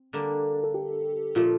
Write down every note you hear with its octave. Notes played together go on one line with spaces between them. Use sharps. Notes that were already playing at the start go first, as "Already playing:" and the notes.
Already playing: C4
D3 G3 A#3 D4
A4
G4
A#2 F3 A3 F4